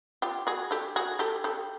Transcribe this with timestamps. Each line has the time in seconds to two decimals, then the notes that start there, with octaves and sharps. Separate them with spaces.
0.22 F4 G4
0.47 F#4 G#4
0.71 G4 A4
0.96 F#4 G#4
1.19 G4 A4
1.44 G4 A4